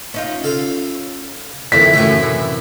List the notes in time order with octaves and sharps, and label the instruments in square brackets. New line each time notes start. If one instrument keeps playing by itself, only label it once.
[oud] C#4 D#4 F4
[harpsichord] A4 F5
[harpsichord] F2 D#3 [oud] E4 D5 [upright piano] B6
[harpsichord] F#2 A2 E4 [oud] E3 A3 C#4
[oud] C3 E3